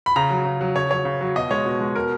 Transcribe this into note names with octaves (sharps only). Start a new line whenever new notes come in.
B5
C#3 A#5
F#3
C#3
F#3
C#3 C#5
F#3 C#5
C#3
F#3
B2 D#5
G#3 C#5
B2
G#3
B2 A#4